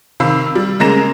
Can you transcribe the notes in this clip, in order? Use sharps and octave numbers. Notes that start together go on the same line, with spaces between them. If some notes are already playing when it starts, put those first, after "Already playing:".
C3 D#3 F5 B5 E6
G3
C#3 G#3 A#3 A#5 A#6 E7